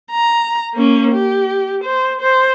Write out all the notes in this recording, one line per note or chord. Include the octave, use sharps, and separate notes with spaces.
A#5
A#3 C#4
G4
C5
C5